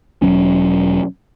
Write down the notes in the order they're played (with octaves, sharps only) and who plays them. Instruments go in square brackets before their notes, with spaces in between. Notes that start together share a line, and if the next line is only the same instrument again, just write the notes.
[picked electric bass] E1 F2 F#3 C#4